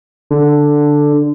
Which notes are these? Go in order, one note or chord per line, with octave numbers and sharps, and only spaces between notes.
D3